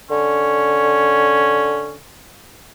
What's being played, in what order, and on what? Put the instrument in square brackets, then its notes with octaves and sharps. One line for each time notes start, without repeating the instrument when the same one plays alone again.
[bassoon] D3 [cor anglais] C#4